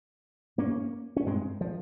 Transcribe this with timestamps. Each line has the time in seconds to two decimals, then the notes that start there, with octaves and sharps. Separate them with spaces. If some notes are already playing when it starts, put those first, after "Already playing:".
0.58 G2 A#3 C#4
1.16 C#4
1.26 G2 G#3 C4
1.61 F3